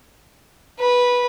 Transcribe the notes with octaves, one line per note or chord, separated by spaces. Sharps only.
B4